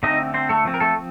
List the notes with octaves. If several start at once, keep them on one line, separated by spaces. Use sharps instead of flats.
D3 A3 C4 D#4 D#5
C4 C5
A3 A4
F3 C4
A#4
A3 A4